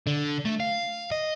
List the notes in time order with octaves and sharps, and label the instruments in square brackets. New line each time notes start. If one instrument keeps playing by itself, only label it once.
[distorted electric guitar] D3
A3
F5
D#5